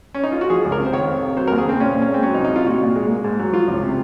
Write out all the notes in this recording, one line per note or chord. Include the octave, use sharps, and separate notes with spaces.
C#4
D#4
F4
F#4
F3 G#4
C#2
A#4
C3
C5
D#3 C#5
F2
C3
F#3 C5
D#2 A#4
G#4
C#3 C4
A#2 C#4
A#2
C#4
G#3
C4
F#3 C#4
D#4
C2
D#4
C3 F4
A#2 F#4
A#2
G#3
A#3
G#2
F#3
F3 F4
C#2
C3